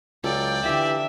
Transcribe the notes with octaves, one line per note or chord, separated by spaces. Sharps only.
C#2 F#3 F4 A4 D5 G5
D3 E3 D4 G4 E5 B6